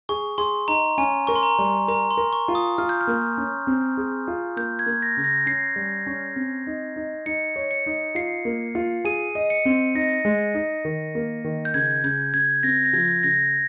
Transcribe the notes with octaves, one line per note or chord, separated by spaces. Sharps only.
G#4 C#6
G#4 C6
D#4 A#5
C#4 G#5
A#4 C#6
C6
A#5
G3
A#4 A#5
C6
A#4
C#6
F4
D#6
F4 F6
G6
F6
A#3
C#4
C4
G#4
F4
A#3 G6
G#6
A#3
A#6
C#3
A#6
C#4 C7
G3
C#4
C4
D#4
D#4
D#4 C#7
C#5
C#7
D#4
F4 C7
A#3
F4
G#4 D#7
D#5
C#7
C4
D#4 A#6
G#3
D#4
D#3
A#3
D#3
G6
C#3 G#6
C#3 G6
C#3 G#6
C4 A#6
A#6
F3 G#6
C#3 A#6